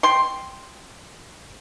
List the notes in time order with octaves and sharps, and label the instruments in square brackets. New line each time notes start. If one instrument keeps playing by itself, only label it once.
[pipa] G5 C6